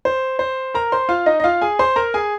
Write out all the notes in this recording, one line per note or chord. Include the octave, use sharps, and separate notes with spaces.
C5
C5
A#4 A#5
C5 C6
F4 F5
D#4 D#5
D#5
F4 F5
G#4 G#5
C5 C6
A#4 A#5
G#4 G#5